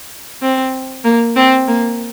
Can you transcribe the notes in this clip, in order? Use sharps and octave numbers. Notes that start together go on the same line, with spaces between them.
C4
A#3
C4
A#3